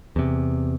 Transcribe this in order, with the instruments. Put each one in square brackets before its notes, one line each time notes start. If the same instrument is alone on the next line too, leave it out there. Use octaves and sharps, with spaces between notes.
[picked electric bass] E2 C3